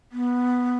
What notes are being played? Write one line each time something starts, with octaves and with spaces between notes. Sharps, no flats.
B3